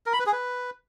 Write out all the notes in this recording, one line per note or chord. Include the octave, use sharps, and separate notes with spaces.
A#4
B5
B4
G#4
B4